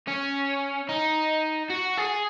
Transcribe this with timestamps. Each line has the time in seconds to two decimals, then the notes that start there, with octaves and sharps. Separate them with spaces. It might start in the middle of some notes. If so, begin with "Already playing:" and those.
0.08 C#4
0.89 D#4
1.70 F#4
1.97 G#4